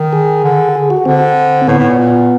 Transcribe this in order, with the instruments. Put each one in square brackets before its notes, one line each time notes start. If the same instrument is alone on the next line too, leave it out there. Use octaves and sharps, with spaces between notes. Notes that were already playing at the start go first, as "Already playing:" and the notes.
Already playing: [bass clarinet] D#3
[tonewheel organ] G#4
[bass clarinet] D3
[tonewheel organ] G#4
F#4
[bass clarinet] D3 [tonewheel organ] C4
[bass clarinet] A2 [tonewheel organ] B3
[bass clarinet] A2
A#2
A#2